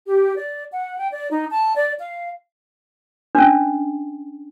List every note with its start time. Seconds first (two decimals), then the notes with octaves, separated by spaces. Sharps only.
0.06 G4
0.36 D5
0.71 F#5
0.98 G5
1.12 D5
1.30 D#4
1.51 A5
1.76 D5
1.99 F5
3.35 C#4 D4